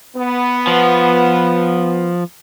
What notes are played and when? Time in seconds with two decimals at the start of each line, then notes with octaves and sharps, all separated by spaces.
0.17 B3
0.67 F3